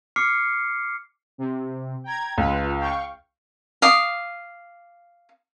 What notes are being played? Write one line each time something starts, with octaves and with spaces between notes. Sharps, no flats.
D6 F6 C7 C#7
C3
G5 A#5 G#6
C#2 F4 B4
F5 G5 C#6
F5 D6 D#6